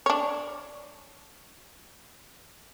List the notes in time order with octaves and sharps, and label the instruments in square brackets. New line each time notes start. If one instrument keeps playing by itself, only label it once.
[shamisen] D4 C#5